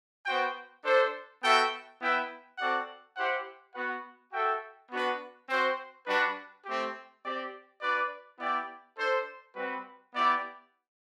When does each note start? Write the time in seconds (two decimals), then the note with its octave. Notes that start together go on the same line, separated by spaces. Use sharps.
0.25 B3 F#4 C5 G5
0.83 D4 A4 C5
1.42 B3 F#4 A4 E5 G5
2.00 B3 E4 B4 E5 G5
2.58 C4 F#4 A4 D5 F#5
3.17 E4 G4 C5 F#5
3.74 B3 F#4 B4 F#5
4.32 F#4 A4 E5 G5
4.90 B3 D4 F#4 B4
5.49 C4 F#4 C5
6.06 G3 D4 F#4 B4
6.65 A3 C4 G4
7.23 C4 G4 D5
7.81 D4 F#4 B4 D5
8.39 B3 E4 G4 D5 G5
8.97 D4 A4 C5
9.55 G3 C4 F#4 B4
10.13 B3 E4 G4 D5